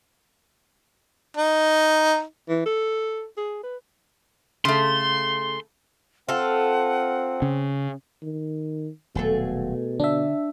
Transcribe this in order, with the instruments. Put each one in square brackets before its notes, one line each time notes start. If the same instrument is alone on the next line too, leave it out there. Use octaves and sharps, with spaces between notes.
[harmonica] D#4
[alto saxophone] E3
A4
G#4
B4
[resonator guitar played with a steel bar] C#3 A3 [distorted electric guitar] C6
[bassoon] C4 [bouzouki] F4 A4 [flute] F#5
[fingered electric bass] C#3
[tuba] D#3
[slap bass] D#1 F#3 [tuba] B2 [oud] A3 G#4 A4
[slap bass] D3 [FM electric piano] D4 E5